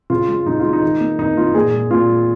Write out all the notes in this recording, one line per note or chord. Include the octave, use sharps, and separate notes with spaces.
C#3 F4
G#3
C#3 D#4
G#3 F4
D#4
D#3
A#3
D#3 D#4
A#3 F4
A#2 G#4
G#3
A#2 F4
G#3